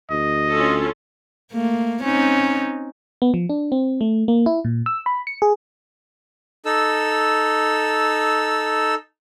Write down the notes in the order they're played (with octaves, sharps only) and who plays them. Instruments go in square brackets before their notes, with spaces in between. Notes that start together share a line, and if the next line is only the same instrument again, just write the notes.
[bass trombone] D2 [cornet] D#5
[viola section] C#4 F4 A4
[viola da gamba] A3 A#3
C4 C#4 D#4
[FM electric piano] B3
F3
D4
C4
A3
A#3
E4
A#2
E6
B5
C#7
G#4
[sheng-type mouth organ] D#4 A4 E6